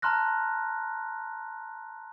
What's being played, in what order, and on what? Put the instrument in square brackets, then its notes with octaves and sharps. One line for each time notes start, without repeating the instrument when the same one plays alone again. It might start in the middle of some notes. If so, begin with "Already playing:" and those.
[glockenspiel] A5 A#5 C6 F6 F#6 A#6